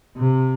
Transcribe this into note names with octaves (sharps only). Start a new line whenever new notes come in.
C3